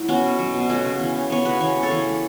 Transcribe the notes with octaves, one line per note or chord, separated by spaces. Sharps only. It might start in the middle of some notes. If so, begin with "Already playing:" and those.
Already playing: F#3 A3 E4
B3 C#4 F#4
B2
F#3
B2
A3 C#4 F#4
C#3
E3
C#3
B3 C#5
C#3 F#4 B4
E3 C#5
C#3
A4 C#5
E3
A3